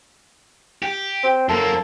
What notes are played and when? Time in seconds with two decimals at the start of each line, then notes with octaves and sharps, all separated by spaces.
0.83 G4
1.23 C4
1.49 F#2 A#3 A4